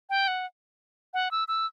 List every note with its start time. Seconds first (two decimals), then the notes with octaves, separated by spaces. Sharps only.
0.10 G5
0.28 F#5
1.14 F#5
1.31 E6
1.48 E6